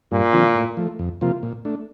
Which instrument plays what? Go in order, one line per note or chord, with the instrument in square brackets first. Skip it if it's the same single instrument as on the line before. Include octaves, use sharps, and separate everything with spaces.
[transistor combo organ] G2 [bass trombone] A#2
[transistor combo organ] D3 F3 C4 F4
A2
F3 A3
F2
C3 F3 A#3 F4
A#2
A3 D4